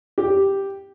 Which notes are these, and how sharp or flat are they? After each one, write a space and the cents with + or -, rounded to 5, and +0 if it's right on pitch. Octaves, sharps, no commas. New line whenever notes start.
G4 +0